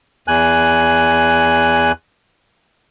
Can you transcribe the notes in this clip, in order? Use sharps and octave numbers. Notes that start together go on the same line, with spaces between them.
E2 G#5 F#6